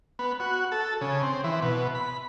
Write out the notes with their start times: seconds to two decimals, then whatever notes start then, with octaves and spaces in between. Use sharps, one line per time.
0.19 B3
0.40 F#4
0.72 A4
1.01 C#3
1.23 C4
1.44 E3
1.62 B2
1.95 B5